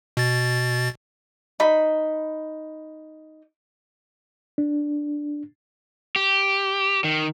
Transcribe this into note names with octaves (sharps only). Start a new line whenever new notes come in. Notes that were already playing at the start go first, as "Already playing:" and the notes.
B2 A6
D#4 B5
D4
G4
D#3